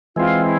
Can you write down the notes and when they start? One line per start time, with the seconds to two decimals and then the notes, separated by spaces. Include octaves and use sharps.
0.16 E3 G#3 C4 F4
0.42 E4